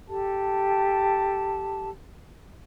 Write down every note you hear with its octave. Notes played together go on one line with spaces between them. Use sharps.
G4 A4 A5